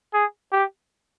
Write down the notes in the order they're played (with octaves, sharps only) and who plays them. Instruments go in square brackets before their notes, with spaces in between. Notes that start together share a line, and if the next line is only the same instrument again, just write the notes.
[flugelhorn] G#4
G4